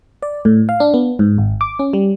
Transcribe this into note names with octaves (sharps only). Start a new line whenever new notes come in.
D5
A2
F5
D4
B3
G#2
G#1
D6
C#4
G3